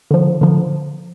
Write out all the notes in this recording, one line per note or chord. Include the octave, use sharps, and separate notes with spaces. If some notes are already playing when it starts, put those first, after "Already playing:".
D3 F3
D3 F3